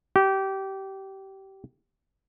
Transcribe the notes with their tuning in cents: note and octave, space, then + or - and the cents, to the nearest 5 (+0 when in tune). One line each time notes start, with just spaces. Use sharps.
G4 -25